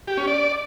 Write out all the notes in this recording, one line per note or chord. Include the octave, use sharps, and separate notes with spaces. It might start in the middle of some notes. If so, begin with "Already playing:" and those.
G4
C#4
D5